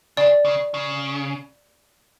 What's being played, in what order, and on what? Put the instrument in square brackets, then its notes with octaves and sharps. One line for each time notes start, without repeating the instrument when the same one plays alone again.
[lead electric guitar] C#3 [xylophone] D5
[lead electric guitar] C#3
C#3